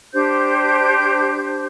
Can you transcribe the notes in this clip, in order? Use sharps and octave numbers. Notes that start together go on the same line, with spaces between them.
D4 G4 C5 G6